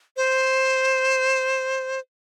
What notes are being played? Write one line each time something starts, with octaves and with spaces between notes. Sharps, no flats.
C5